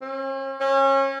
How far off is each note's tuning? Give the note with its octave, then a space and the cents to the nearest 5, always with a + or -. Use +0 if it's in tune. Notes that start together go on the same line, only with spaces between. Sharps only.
C#4 -45
C#4 -30